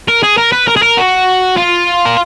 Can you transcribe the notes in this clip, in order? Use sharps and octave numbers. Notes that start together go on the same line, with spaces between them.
A#4
G#4
A#4
B4
A#4
G#4
A#4
F#4
F4
A#4